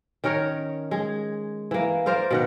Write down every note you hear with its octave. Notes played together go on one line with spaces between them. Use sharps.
D#3 C#4 A#4 C#5
G#3 G#4
E3 A#3
A#4 C5 D5 F5
B2 D#3 F#5